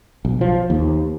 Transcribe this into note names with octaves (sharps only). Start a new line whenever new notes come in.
B1
F3
D#2